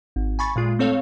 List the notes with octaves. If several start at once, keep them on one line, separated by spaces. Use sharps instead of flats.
G#1
G#5 B5 C#6 A6
A#2 G#3 F4
A3 C4 A4 C#5 F5